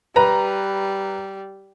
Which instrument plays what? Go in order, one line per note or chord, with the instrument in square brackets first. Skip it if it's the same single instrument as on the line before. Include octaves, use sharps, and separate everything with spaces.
[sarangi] G3 [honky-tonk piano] B4 A#5